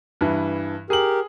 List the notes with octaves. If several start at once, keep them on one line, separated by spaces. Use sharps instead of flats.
G2 E3
G4 G#4 A#4 F#7